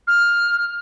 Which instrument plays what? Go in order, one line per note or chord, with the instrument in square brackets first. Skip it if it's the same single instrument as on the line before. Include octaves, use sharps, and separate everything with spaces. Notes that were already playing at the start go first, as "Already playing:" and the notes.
[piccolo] F6